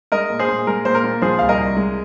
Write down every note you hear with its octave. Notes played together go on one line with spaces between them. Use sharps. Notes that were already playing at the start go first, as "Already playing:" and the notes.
G#3 A#4 D#5
A#2
G#4 C5
A#2
G#3 A#4
A#2 C5
A#4
A#2
F3 G#4 C5
C2 F5
A#4 D#5
C2
G#3